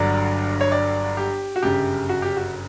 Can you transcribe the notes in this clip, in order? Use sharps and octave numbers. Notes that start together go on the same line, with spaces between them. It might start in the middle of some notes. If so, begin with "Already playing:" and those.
Already playing: G1 G2 D3 F#3 D5
C#5
D5
G4
F#4
G1 F#2 C#3 G4
F#4
G4
F#4